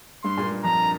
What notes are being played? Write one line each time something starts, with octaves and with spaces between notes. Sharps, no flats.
G2 C6
A#2
G2
F2 A#5